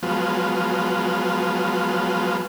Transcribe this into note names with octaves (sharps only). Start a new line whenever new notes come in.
F3 F#3 G#3 B3 F4